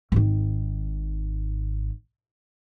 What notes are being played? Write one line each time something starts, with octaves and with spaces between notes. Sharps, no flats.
G#1 D#3